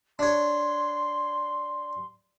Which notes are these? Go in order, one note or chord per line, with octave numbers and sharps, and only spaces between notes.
D4 C#5 C6